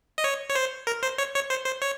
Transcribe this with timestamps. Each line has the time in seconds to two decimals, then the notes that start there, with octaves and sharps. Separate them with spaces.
0.18 D#5
0.24 C#5
0.50 C#5
0.55 C5
0.87 A#4
1.03 C5
1.18 C#5
1.35 C#5
1.50 C5
1.66 C5
1.82 C#5